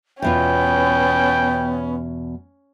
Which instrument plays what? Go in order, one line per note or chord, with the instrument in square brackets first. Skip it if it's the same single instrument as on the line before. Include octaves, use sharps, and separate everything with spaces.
[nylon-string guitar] E2 B2 F4 [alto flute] B3 [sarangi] C#4 [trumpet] G5